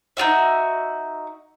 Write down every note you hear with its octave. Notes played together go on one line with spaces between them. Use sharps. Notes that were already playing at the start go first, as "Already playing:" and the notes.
D#4 F4 F#4 E5